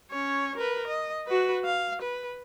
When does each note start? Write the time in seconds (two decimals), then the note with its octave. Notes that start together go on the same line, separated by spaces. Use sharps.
0.11 C#4 C#5
0.57 A#4 B4
0.87 D#5
1.27 F#4 B4
1.65 F5
2.02 B4